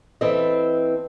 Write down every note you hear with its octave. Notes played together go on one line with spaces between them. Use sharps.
E3 C4 E4 A4 D#5